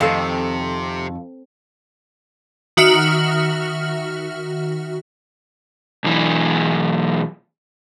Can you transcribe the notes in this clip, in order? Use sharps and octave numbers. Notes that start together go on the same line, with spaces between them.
F2 C3 D#3 A4 F5
D#3 F#4 E5 F6
B1 E3